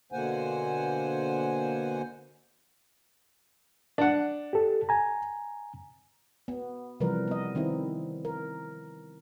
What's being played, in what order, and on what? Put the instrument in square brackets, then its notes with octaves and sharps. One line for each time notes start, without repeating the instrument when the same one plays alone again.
[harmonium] B2 D3 A#3 C5 F#5 G#5
[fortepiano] D4 F#5
[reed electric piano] G4 A4
G#5 A#5
[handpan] B3
C3 E3 F3 G3 A#4 B4
B3 D#5
D#3 C4 D#4 E4
A#4